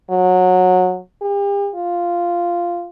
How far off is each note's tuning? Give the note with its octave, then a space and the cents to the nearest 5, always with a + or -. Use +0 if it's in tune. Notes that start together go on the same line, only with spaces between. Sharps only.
F#3 -20
G4 +40
F4 -5